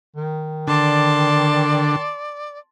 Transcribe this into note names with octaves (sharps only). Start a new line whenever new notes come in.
D#3
D3 D5 A5 C6